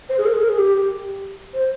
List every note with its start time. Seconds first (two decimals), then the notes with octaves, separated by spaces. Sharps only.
0.09 C5
0.18 G#4
0.25 A#4
0.33 G#4
0.41 A#4
0.49 G#4
0.57 G4
1.54 C5